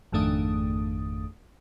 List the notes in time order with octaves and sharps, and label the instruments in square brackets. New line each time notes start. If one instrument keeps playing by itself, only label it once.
[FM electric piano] G#1 F2 D#3 A3 D4 D#6